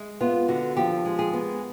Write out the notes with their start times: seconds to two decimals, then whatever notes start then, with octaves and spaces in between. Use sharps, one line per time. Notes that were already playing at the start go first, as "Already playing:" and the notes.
Already playing: G#3
0.21 B3 F4
0.48 D3 F#4
0.77 F3 G4
1.05 G#3
1.19 G#4
1.34 B3